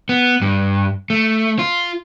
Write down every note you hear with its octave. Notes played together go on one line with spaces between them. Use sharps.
B3
G2
A3
F4